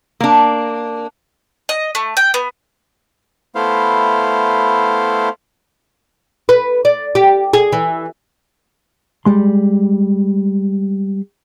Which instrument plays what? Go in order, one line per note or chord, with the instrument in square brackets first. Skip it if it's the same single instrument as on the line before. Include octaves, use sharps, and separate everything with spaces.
[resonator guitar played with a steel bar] A#3 D4
[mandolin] D#5
A3
G5
B3
[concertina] A3 B3 E4 C5 F5
[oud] B4
D5
G4
G#4
E3
[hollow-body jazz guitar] G3 G#3 C6